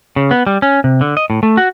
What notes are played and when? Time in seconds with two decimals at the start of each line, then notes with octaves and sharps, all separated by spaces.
0.16 C#3
0.31 B3
0.47 G3
0.62 C#4
0.84 C3
1.01 D3
1.17 D#5
1.30 A2
1.43 A3
1.57 F#4